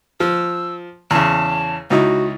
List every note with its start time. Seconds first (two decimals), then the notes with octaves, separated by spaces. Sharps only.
0.20 F3 E6
1.11 E2 C#3 A5
1.90 C#2 D#4 E4 F#4